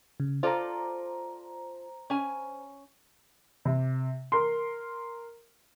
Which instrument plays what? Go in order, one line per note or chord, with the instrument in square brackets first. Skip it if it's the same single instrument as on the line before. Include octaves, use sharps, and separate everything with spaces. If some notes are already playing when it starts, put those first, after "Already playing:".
[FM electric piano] C#3
[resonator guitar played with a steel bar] F4 A4 D5 [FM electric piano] C5 A#5
[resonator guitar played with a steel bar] C#4 G#5
[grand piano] C3
A#4 C6